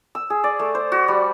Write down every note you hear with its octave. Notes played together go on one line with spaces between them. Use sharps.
E6
G#4
D5
A3
C5
F#4
G3